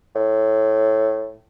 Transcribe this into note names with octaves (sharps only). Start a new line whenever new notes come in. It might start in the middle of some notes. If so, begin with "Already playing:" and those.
A2